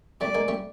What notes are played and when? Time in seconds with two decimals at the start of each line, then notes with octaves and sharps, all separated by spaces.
0.21 G3 A3 D5
0.35 G#3 A#3
0.48 G3 A3